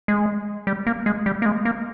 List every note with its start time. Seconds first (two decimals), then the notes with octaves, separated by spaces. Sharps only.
0.08 G#3
0.67 G3
0.87 A#3
1.06 G#3
1.26 G3
1.42 A#3
1.46 G#3
1.65 A#3